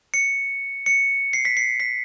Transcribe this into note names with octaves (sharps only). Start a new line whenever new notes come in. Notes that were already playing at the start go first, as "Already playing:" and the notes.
C#7
C#7
C7
B6
C7
B6